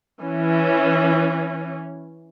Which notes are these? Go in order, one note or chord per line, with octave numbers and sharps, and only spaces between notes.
E3 C#4